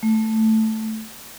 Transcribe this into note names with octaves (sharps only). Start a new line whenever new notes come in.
A3